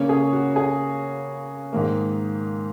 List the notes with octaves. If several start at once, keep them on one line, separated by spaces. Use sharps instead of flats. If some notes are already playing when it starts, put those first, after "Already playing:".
Already playing: C#3 A#3 C#4 C#5
G#4
F#4
G#4
G#2 D#3 A#3